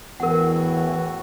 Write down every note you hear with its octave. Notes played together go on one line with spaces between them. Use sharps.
E2 A2 E3 F#4 A#4 F#5